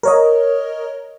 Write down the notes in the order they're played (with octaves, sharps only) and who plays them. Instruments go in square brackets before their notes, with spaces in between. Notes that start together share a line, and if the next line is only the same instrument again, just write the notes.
[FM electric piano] A#4 C#5 D#5